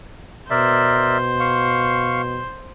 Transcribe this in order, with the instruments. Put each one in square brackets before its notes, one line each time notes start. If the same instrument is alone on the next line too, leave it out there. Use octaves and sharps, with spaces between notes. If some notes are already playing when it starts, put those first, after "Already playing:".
[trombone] B2 [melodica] A#4 D5 E5 [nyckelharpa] C5
[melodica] F5 C#6